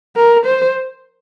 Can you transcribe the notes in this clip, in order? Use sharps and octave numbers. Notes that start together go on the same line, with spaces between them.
A#4
C5